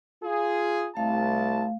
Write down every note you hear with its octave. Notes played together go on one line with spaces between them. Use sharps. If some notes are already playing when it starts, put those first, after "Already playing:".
F4 G#4
C2 A3 F5 A5